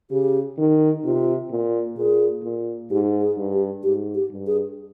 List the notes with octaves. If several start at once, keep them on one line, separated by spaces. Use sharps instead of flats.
C#3 G4
D#3
C3 F4
A#2
A#2 G#4
A#2
G#2 G4
G#4
G2
G4
G#2 G4
G4
G2
G#4